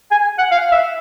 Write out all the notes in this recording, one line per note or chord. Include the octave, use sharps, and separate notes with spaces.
G#5
F#5
F5
E5